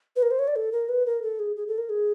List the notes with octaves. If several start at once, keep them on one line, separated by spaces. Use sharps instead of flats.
B4
A#4
C5
C#5
D5
A4
A#4
B4
A#4
A4
G#4
G#4
A4
A#4
G#4